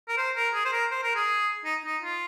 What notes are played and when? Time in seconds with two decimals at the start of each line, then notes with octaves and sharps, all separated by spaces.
0.08 A#4
0.18 C5
0.36 A#4
0.54 G#4
0.65 C5
0.73 A#4
0.91 C5
1.03 A#4
1.16 G#4
1.65 D#4
1.85 D#4
2.02 F4